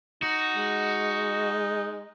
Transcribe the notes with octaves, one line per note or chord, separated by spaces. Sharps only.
D#4 F#4
G#3